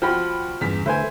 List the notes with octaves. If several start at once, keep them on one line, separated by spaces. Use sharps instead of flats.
F3 F#4 G5 B5
E2 G2 C#3 B6
D3 A3 E4 B4 C5 G#5